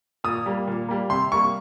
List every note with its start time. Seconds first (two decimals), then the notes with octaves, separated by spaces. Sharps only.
0.24 A#2 D#6
0.46 G3 A#3
0.68 A#2
0.89 G3 A#3
1.10 C3 C6
1.32 G3 A#3 C#6